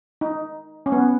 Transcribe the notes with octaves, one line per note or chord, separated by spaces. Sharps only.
D#4
C#4
B3